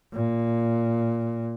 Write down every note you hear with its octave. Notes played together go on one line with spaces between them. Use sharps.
A#2